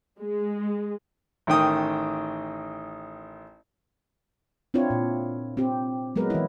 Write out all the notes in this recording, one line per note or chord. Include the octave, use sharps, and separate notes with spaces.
G#3
A1 D#3 G5 D#6
C4 D4 E4 F4 C#5
A#2
C4 G4
F#3 G#3 B3 A#4 B4
E3 E4